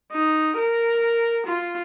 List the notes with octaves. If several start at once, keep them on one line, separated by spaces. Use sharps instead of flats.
D#4
A#4
F4